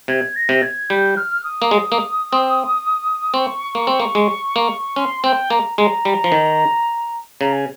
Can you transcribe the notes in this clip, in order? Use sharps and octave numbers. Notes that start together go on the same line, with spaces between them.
C3 G#6
A#6
C3
G#6
G3 G6
F6
D#6
A#3
G#3
A#3
C4
C4 C#6
A#3
C4
A#3
G#3
A#3
C#4 C6
C4 G5
A#3 A#5
G#3 A#5
G3
F3
D#3
C#3 A#5
G#5